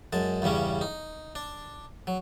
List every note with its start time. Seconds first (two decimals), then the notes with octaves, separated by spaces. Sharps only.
0.13 F#2 G#3 A5
0.42 E2 G2 C#3 G3 C#4
0.81 D#4
1.35 D4
2.07 F#3